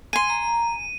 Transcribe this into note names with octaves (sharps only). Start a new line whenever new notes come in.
G#5 C6 D#7
A#5